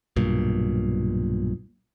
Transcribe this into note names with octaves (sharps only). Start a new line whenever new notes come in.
B1 G2 A#2